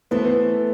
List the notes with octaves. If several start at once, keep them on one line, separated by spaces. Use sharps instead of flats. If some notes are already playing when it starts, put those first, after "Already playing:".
E3 A3 B3 E4 A4 C5